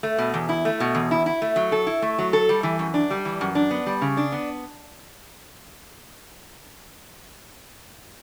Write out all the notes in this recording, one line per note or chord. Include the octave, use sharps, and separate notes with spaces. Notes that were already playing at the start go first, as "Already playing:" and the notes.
A3
B2
E2
E4
A3
B2
E2
E4
E4
A3
F#3
A4
E4
A3
F#3
A4
G3
E3
F#2
D4
G3
E3
F#2
D4
B3
G3
C#3
D4
B3